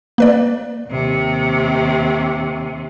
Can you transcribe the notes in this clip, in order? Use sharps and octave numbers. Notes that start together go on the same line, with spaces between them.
A#3 B4 D5
D#2 C3